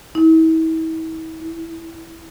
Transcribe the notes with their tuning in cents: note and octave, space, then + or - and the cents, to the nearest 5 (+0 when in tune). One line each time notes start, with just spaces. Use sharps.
E4 -40
E4 +0